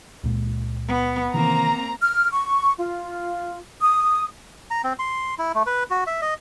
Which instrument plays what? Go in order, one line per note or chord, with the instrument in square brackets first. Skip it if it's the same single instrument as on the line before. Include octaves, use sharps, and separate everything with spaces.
[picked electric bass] C#2 A#2 G#3
[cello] B3
[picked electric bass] C3 D#3 E3 [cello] A#3 C4 [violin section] A#5
[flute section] F6
C#6
F4
D#6
[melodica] A#5
C4
C6
E4
A3
B4
F#4
E5
D#5